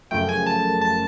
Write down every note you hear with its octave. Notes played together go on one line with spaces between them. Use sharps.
F#2 C#3 F3 A3 G5
G#5
A5
A5